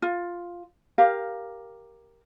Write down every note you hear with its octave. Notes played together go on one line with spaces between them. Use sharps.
F4
G4 A#4 F5